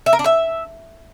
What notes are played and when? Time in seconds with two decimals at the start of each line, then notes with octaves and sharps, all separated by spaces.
0.06 E5
0.13 A#4
0.19 D4
0.26 E5